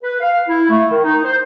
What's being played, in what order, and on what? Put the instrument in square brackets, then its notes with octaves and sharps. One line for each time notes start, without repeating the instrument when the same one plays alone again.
[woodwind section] B4
F5
E4
A3
D#3
D#4
C5